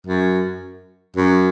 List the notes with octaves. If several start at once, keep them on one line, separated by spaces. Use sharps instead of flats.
F#2
F#2